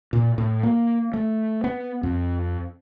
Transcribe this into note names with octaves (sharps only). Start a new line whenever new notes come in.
A#2
A2
A#3
A3
B3
F2